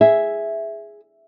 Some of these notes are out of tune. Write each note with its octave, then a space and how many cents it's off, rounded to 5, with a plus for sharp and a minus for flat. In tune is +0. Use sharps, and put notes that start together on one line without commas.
G#4 +0 E5 +0